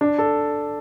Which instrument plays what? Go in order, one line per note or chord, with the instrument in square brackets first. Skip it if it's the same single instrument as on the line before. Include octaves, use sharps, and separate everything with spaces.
[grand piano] D4
A4